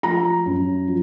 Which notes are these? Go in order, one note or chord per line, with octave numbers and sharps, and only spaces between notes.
F3 A#5
F#2
F3